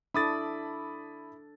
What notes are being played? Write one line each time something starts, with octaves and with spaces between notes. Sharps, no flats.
D4 E4 A4 B5 D6 D#6 A6